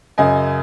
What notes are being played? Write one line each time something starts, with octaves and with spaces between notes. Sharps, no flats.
F#2 C#3 D#5 G#5